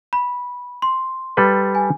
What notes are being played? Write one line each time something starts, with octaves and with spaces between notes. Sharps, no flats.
B5
C6
G3 A4 B4
G#5